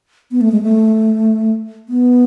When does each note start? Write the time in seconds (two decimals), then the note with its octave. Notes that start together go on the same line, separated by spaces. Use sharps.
0.31 B3
0.41 A3
0.52 G#3
0.62 A3
1.89 B3